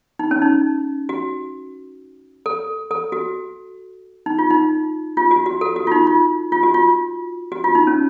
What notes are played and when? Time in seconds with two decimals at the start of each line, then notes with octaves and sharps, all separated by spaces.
0.19 D#4
0.31 C#4
0.42 D#4
1.09 F#4
2.46 A4
2.91 A4
3.12 F#4
4.26 D#4
4.39 F4
4.50 D#4
5.17 F4
5.31 F#4
5.46 F#4
5.61 A4
5.76 F#4
5.87 F4
5.92 D#4
6.07 F4
6.52 F4
6.63 F#4
6.74 F4
7.52 F#4
7.64 F4
7.75 D#4
7.87 C#4